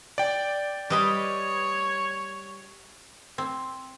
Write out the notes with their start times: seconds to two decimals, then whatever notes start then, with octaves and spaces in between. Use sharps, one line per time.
0.18 D5 G5
0.90 G3 B4 C#5 D#5 B5
3.38 C4